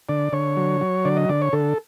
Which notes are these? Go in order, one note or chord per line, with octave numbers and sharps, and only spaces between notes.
D3 D5
D3 C#5
F#3
F#3
D3 D5
D#5
D3 D5
C#5
D3 A4